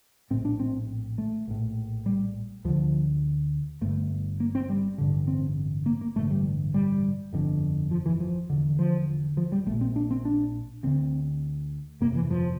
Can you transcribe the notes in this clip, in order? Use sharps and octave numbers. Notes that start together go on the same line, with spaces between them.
A#1 A2 C4
D4
C4
A3
A#1 A2
G3
D2 D3 F3
G1 G2 D3 A3
A#3
C4
G3
A1 G2 D3
C4
A#3
A#3
A1 G2 D3 A3
G3
G3
G1 F2 D3
F3
E3
F3
E1 E2 D3
F3
F3
G3
A#1 A#2 A3
C4
D4
C4
D4
D2 D3 C4
G1 F2 C3 A#3
E3
F3